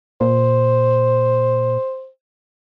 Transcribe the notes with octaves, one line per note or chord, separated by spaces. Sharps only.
A#2 C5